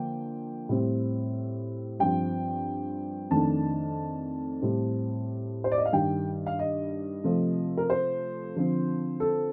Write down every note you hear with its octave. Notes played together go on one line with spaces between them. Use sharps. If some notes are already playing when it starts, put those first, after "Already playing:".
Already playing: D3 F3 A#3 D4 G5
A2 G3 C4
G2 F3 C4 G5
F2 D#3 A3 D4 A5
A2 G3 C4
C5
D5
D#5
F5
G2 D#3 G3 G5
F5
D#5
C3 F3 A3
A#4
C5
D3 F3 C4
A4